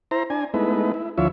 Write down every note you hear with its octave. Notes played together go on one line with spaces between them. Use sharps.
E4 C5 A#5
D4 G#5
G#3 A3 B3 D#4 E4 B4
E4
D2 F3 E4 F4 C#5 E5